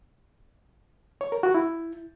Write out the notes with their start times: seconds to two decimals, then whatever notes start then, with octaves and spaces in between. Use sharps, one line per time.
1.21 C#5
1.32 A#4
1.43 F#4
1.54 E4